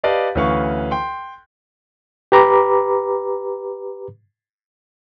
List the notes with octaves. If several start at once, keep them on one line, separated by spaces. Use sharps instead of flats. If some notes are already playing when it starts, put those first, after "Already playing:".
G4 B4 D5 D#5 F5 A5
D2 E3 C#4 B4 F5 C#6
G5 C6
G4 B4 A#5 B5 D6